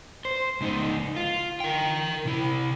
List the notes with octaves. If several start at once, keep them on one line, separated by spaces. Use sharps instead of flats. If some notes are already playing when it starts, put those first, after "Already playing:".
C5
C#2 D#4
F4
A#4 G5
C3 E4